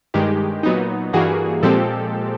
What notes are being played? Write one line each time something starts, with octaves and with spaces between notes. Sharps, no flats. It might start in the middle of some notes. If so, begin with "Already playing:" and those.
G2 D#3 G#3 G4
A#2 F#3 B3 D#4
G2 E3 G3 A#3 F#4 G#4
A#2 F3 G#3 C4 G4 A4